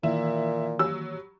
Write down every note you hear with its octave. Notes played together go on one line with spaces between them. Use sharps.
A#2 D#3 E3 A#3 E4
F#3 G3 E6